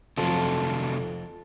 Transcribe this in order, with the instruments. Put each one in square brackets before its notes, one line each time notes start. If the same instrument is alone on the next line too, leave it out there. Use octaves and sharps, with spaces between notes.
[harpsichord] F2 [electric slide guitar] C3 F3 F#3 [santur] A4